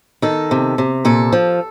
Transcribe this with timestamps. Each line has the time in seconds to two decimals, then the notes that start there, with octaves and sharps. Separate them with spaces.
0.22 D#3 A4
0.51 C3
0.78 C3
1.05 A#2 A4
1.33 F3